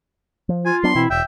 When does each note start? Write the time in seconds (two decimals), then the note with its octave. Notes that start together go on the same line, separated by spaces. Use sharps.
0.49 F3
0.65 F4 G#5
0.83 F#3 B3 D4 C6
0.95 B2 E3 C4 E4
1.10 E1 E5 G5